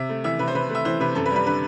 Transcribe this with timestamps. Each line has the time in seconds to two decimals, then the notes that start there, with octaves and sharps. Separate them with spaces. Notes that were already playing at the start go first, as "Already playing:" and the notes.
Already playing: C3 E5
0.09 A3
0.24 E3 E5
0.39 C3 B4
0.48 C5
0.54 C3 B4
0.69 A3
0.75 E5
0.85 E3 C5
1.00 C3 B4
1.15 F#2 A4
1.26 B4
1.30 G3
1.36 B4
1.46 D3 B4